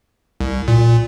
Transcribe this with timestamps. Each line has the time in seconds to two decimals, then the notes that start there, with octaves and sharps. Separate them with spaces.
0.40 C2
0.68 A#2